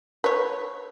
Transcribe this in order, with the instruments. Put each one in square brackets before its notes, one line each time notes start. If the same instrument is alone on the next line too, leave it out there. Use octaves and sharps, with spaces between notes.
[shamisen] B4 C#5